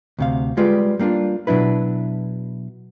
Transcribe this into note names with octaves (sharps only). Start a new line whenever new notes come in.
D2 C3 F5
G3 G#3 F4 G4 B4 D5
G3 A#3 D4 F4
B2 F#3 D4 E4 B4